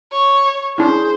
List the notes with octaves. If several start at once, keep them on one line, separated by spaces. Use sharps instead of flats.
C#5
C#4 D4 E4 G#4 C5